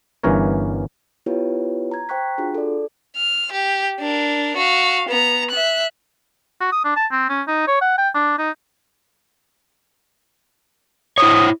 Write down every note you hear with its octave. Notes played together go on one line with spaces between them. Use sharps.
G1 G2 E3 C#4 A#4 C#5
B3 E4 F4 G4 B4 C#5
A#5 G#6
C5 G5 A#5 C#6 F#6 B6
D4 F4 F#4 G#4
A4 D5
F6
G4
D4 A#4
F#4 F5
B3 A#5
E5 F#6
F#4
D#6
D4
A5
C4
C#4
D#4
C#5
F#5
G5
D4
D#4
E4 C5 C#5 D#6